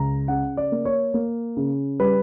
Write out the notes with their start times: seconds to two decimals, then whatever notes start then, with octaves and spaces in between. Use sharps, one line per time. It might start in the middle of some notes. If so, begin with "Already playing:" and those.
Already playing: C#2 A#5
0.28 C#3 F#5
0.57 D5
0.72 A#3
0.85 C#5
1.14 A#3
1.57 C#3
2.00 G3 B4